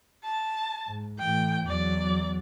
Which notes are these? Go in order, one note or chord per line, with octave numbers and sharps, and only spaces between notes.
A5
G#2
A2 E3 G5
E2 F#3 D5